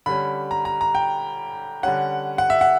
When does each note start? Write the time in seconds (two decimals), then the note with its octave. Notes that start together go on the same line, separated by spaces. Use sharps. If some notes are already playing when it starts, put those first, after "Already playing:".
0.06 D3 G3 C#4 B5
0.51 A#5
0.65 A#5
0.81 A#5
0.95 G5
1.83 D3 G3 C#4 F#5
2.38 F#5
2.50 E5
2.61 F#5